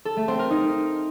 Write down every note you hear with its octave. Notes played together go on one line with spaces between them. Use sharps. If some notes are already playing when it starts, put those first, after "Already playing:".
A4
A3
C4
A#4
D#4